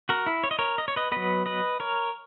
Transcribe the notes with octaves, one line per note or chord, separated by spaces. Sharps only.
F#4 A#4
E4
C#5
D#5
A#4 C#5
D#5
C#5
B4 D#5
F#3 B3 B4 D#5
B4 D#5
A#4 C#5